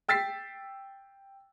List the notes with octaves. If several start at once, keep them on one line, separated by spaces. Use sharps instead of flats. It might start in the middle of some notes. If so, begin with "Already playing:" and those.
G5 E6 A6 B6 C7